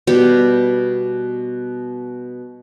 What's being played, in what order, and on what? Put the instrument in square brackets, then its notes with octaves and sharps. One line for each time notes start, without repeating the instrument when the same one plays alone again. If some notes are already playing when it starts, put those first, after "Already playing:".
[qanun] B2 G3 G4